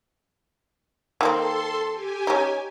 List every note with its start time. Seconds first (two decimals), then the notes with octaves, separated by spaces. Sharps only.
1.21 D#3 A#3 C4 A4 C6
1.92 G4 G#5
2.27 C#4 D#4